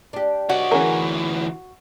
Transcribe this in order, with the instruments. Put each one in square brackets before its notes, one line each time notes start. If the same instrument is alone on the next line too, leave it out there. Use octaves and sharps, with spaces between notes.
[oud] D4 G4
[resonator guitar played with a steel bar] F#4 [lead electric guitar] C#5 D#5
[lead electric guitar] D2 E3 [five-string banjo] C#4 G#4 A#4